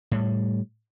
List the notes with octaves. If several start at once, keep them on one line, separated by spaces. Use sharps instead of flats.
A2 G3